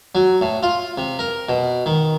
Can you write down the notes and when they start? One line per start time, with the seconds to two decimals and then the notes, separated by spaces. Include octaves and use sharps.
0.15 F#3
0.41 A2
0.63 F4
0.98 C3
1.19 A#4
1.49 B2
1.86 D#3